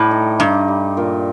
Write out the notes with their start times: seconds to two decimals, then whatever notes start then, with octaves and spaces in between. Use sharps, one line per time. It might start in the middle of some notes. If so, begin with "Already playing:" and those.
Already playing: A2 G3 A3
0.11 D#4
0.40 G2 D#4
0.68 G3
0.97 A#2